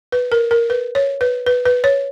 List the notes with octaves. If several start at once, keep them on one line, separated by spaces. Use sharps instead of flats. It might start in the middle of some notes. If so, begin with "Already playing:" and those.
B4
A#4
A#4
B4
C#5
B4
B4
B4
C#5